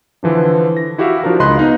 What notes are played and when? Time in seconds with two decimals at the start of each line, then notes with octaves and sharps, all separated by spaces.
0.23 D3 E3 F3 D4
0.77 A#6
0.98 E4 F#4 G4 E5 F5
1.24 F3 D4 F4 F#4 A#4
1.40 C#2 D#5 B5 C6 F#6
1.57 B3 D#4 F5